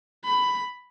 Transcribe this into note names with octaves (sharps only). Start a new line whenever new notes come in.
B5